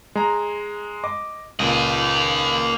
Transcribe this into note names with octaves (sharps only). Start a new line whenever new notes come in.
G#3 A#5
D#5 D6
C#2 A#2 A#3 D#5